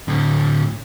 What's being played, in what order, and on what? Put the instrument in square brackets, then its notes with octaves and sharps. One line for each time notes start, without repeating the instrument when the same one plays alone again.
[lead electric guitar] A2 D3